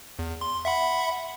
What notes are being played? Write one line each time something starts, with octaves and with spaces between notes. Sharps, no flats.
E2
C6
E5 F#5 B5